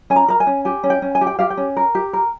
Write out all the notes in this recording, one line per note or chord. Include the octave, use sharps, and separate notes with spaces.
C#4 G#5
A#5
A#4 A#5
G#5
C#4
G4 G#5
C#4
G5
C#4
G#5
G4
G5
G4 F5
G5
C#4
A#4
G4
A#4